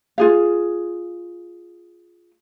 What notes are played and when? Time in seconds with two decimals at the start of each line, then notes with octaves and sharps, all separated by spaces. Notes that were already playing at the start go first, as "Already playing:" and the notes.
0.18 F4 G#4 F5